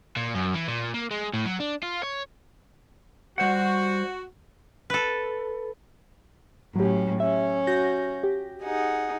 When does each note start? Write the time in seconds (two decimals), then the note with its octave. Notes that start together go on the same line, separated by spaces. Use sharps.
0.16 A#2
0.34 F#2
0.54 E3
0.68 A#2
0.94 A#3
1.11 G#3
1.33 A2
1.45 F#3
1.60 D4
1.83 F4
2.04 C#5
3.38 G3 F#4 C5 F#5
4.90 A4 B4
6.76 A2 F#3 C#4 G4
7.20 C#4 E5
7.67 F#4 G6 A#6
8.24 G4
8.63 D#4 G#4 F#5